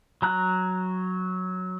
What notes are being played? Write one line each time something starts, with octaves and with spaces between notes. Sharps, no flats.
F#3 A#5 F#6